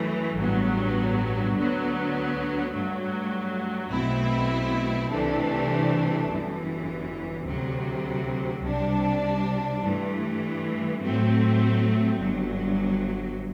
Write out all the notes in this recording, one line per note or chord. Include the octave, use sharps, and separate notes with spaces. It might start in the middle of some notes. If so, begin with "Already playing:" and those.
Already playing: F#2 E3 A3
A1 G2 F#3 B3
D2 D3 F#3 B3
G2 F#3 A3
B1 B2 A3 C4 E4
C2 C3 E3 A3 D4
G1 F#2 E3
D2 C3 F#3
C2 C3 G3 D4
G2 E3 A3
A2 F#3 A3 C4
G1 G2 F#3